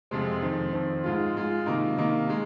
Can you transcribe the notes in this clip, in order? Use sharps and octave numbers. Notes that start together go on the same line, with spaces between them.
F2 C3 G#3 C4
F2 D#3 C4
F2 D#3 C4
G#2 G#3 F4
G#2 G#3 F4
C3 D#3 A#3 D#4
C3 D#3 A#3 D#4
G#3 D#4